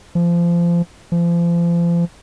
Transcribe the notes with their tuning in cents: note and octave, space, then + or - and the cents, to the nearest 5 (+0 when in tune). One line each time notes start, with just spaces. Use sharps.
F3 -25
F3 -35